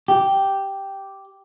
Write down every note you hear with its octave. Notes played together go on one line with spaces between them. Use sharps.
G4